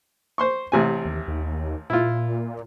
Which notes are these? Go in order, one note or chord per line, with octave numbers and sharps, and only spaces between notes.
C5 C6 C#6
A1 C3 G#5
D#2
D#2
A#2 E4 F4